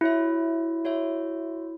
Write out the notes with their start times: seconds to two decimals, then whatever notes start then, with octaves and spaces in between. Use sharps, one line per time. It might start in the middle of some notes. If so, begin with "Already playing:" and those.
0.01 E4 F#4 C#5 E5
0.85 F#4 C#5 E5